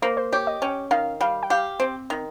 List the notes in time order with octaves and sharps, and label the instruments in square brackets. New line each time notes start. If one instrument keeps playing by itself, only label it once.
[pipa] A#3 [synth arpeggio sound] C5
[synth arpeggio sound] C5
[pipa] G4 [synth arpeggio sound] C#5
[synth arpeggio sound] D#5
[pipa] C#4 [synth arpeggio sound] G5
[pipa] D#3 [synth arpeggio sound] F5
[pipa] G3 [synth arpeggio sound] F5
[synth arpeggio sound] G5
[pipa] G4 [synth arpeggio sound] F5
[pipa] C4
D#3